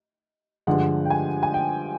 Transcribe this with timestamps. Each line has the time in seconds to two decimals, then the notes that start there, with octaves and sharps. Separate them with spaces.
0.67 G2 D3 F3 G#3 F#5
1.05 G5
1.10 G#5
1.43 G#5
1.54 G5